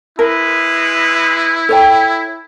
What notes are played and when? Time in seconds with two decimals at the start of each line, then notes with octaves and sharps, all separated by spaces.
0.19 G#3 E4 A#4 B4
1.69 A4 C#5 G5